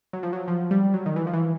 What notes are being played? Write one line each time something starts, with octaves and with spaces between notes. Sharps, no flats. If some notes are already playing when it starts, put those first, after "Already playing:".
F#3
F3
F#3
F3
G3
F#3
D#3
E3
F3
E3